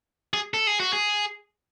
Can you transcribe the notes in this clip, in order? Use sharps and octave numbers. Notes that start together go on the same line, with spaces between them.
G#4
A4
G#4
F#4
G#4